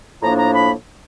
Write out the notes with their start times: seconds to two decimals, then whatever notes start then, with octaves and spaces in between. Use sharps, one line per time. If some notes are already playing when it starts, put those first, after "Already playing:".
0.22 A2 F3 A#3 D4 A#5
0.38 A#5
0.54 B5